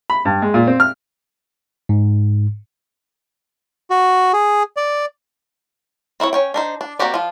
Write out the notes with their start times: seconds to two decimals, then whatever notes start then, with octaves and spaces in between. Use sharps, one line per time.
0.10 B5
0.25 G2
0.42 G#3
0.54 A#2
0.67 C4
0.80 F6
1.89 G#2
3.90 F#4
4.33 G#4
4.77 D5
6.20 C4 E4 C5 C#5
6.33 C#4 C#5 G5
6.54 D4 D#4 C5
6.81 D4
6.99 A#3 C4 F#4 G4 D5
7.14 F3 F4